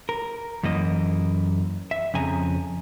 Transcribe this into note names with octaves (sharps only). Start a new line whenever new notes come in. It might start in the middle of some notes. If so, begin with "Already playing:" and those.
A#4
F#2 E3 A#3 D#5
E5
F2 C#3 G#5 A#5